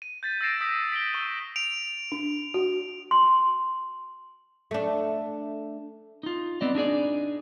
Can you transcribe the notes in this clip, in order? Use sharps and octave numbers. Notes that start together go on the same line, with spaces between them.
D#7
G6 A6 B6
E6 A6 A#6 C7 D7 E7
D#6 E6 G6 B6
B6 D7 F#7 G7
C#6 E6 D#7 G7
D7 F7
D4
F#4
C6
A3 D4
D#4 F4
B3 C4 D5 D#5
D4 D#4 G#4 D5